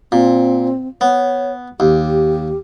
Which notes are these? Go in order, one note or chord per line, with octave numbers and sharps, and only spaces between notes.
A#2 C4
B3 C#5
D#2 G4